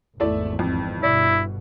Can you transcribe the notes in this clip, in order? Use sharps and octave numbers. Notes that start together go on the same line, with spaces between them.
G#1 E2 A3 E4 D5
F2
G1 G2 B2 E4 D5